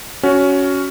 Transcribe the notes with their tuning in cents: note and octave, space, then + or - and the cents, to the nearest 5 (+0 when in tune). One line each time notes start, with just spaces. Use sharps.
C#4 +10 F#4 +0